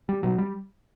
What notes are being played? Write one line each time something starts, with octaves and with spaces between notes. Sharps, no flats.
G3
B2 F#3
G3